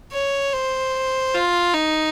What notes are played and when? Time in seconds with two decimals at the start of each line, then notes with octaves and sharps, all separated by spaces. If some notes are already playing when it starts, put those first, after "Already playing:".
0.13 C#5
0.53 C5
1.34 F4
1.74 D#4